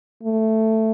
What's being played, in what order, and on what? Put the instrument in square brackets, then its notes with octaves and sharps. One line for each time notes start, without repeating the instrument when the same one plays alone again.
[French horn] A3